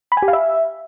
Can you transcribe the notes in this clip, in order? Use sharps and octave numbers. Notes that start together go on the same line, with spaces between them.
B5
G#5
G4
F5
E5